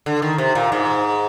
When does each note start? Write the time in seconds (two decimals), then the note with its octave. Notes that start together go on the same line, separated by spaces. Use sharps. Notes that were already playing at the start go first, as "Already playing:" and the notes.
0.06 D3
0.22 D#3
0.38 C3
0.55 A#2
0.72 G#2